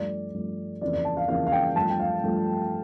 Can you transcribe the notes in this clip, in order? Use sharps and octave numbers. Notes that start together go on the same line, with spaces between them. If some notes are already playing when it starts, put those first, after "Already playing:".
Already playing: G2 F3 A3 D5
G2 F3 A3
F2 C#3 E3 A#3 D5
D5
A5
F5
F2 C#3 E3 A#3 F5
F5
G5
G2 F3 A3 A5
G5
F5
G2 F3 A3